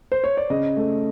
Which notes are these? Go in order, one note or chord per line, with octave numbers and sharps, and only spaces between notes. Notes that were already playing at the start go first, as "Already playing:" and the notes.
C5
C#5
D5
C#3 D#5
A3